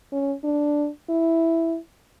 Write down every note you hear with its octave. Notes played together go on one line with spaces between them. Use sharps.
C#4
D4
E4